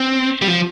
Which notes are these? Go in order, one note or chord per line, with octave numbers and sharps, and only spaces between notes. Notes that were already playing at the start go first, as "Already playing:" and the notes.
Already playing: C4
G3
F3